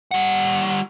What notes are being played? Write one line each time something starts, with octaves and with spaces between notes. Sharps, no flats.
G3 F#5